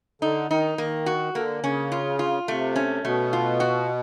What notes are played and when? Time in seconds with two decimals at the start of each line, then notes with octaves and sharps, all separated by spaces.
0.22 D3 D#4
0.50 D#3 D#4
0.78 D#3 A#3
1.06 F#4
1.35 D3 A#3
1.63 C#3 C#4
1.92 F4
2.19 F4
2.48 C3 A3
2.76 C#4
3.04 B2 A3
3.33 F4
3.60 F#4